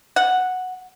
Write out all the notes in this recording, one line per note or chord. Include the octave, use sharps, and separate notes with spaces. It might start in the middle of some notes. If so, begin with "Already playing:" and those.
F#5